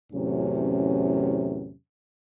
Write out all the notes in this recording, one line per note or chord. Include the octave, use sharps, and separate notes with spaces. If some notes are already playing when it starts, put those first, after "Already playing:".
E2 A2 C3 F#3 C#4